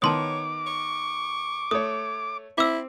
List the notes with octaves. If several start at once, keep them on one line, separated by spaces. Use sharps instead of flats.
D#3 B3 C#5 A5 C6 D6 D#6
C#6
A3 C#5 D#6
C4 E4 D6 E6